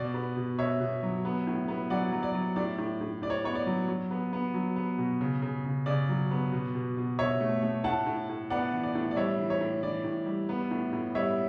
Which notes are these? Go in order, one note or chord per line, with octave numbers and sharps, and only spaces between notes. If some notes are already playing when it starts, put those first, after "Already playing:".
Already playing: B2 D5
B3
B2
B2 C#5 E5
B2
F#3
B3
A2
B3
F#3 D5 F#5
F#3
D5
F#3
A2 D5
A2
A2
A2 D5
C#5
B3 C#5
D5
F#3
F#3
B3
B3
F#3
B3
B2
C#3
C#3
C#3
C#3 D5
F#3
B3
B2
B2
B2
B2 C#5 E5
A3
A3
A2 F#5 A5
A2
A2
B3 D5 F#5
E3
D5
A2
D5
G3 C#5 E5
E3
C#5
A2
E3 D5
A2
G3
B3
A2
A2
G3 C#5 E5